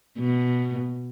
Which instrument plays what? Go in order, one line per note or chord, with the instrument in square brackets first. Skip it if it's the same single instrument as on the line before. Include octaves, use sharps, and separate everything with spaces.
[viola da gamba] B2